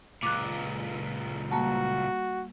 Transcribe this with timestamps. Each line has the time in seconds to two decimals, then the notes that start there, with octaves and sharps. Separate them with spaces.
0.23 C#2 A#2 D6 F#6
1.52 G3 A#3 F#4 A5